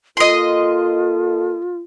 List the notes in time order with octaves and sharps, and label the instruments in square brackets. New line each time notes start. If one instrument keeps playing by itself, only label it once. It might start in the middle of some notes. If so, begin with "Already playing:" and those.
[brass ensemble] A#3 A4 [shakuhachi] F4 [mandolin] D#5 C6